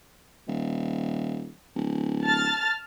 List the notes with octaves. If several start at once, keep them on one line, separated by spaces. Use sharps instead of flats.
D#1
D1
A5 F6 A6